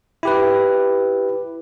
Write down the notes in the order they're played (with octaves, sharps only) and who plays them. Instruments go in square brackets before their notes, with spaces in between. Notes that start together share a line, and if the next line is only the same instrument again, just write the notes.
[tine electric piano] E4 G4 B4